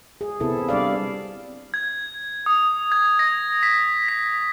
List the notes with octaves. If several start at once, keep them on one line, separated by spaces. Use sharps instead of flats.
G#4
C3 B3 C4 E4 A4
G3 D4 D5 F5
G#6
D#6
G#6
A#6
B6
B6